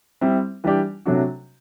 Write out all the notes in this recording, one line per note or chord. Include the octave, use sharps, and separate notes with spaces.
G3 C4 E4
E3 G3 D4 G4 D5
C3 F#3 A3 D4 F#4